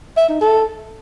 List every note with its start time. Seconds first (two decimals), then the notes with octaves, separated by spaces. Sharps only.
0.17 E5
0.29 D#4
0.41 A4